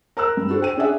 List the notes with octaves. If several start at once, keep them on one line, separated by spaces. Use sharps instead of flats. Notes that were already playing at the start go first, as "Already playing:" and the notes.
A#4 A#5 E6 F#6
G2
D4 F#4 A4 C5
G5 D#7
C#4 D4 G#4 D5 E5 F#5